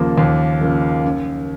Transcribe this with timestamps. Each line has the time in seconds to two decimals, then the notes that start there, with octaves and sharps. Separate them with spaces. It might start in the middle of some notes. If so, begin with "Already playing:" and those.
Already playing: D#2 C#3 F3 A#3
0.18 D#2
0.61 C#3 F3 A#3
1.04 F#2